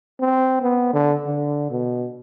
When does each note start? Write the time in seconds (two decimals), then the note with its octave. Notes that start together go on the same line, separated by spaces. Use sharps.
0.20 C4
0.62 B3
0.93 D3
1.26 D3
1.71 B2